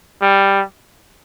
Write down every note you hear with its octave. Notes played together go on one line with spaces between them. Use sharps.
G3